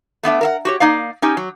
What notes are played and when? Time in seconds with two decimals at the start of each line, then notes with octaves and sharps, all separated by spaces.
0.23 A3 B3 D4 E5
0.41 A#4 E5 F#5
0.65 F#4 G4 C#5
0.80 A#3 D#4 D5 F5
1.22 C#4 D#4 G4
1.37 F#3